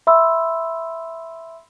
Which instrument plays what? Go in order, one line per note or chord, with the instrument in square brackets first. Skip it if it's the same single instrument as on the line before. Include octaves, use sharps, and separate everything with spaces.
[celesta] E5 B5 C6 E6